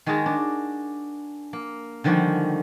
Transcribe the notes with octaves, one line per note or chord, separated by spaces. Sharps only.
D#3 G#3 F#4 G#4 A5 A#5
D4
A#3
D3 D#3 F3 G3 G#3 F#4